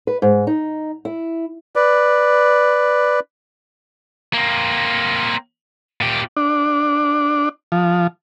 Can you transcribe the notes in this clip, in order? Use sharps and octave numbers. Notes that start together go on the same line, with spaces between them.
B4
G#2
D#4
E4
B4 D5
A#3 C4
A#2 G4
D4
F3